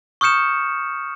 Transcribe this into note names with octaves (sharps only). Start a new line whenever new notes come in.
C#6 D#6 F6 G6 C#7 E7